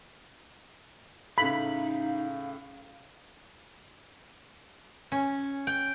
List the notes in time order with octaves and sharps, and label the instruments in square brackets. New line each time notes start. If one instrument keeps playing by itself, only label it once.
[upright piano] A2 C#3 [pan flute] D#4 [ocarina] F5 [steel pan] B5
[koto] C#4
G5